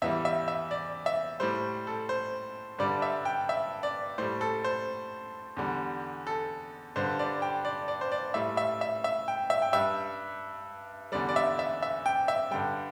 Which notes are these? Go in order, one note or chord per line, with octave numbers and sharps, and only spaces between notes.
E2 E3 G3 E5
E5
E5
D5
E5
A2 G3 C5
A4
C5
G2 D3 G3 D5
E5
G5
E5
D5
A2 G3 C5
A4
C5
E2 D3 G3
A4
G2 D3 G3 C5
D5
G5
D5
D5
C5
D5
A2 G3 E5
E5
E5
E5
G5
E5
G5
G2 G3 E5
E2 D3 G3 D5
D5
E5
E5
E5
G5
E5
G2 D3 G3 G5